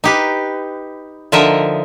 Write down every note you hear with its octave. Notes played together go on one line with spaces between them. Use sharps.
D#4 G4 B4
D3 F3 D#4 A#4 D#5 E5